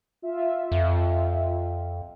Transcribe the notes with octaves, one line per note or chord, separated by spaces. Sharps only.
F4 E5
F2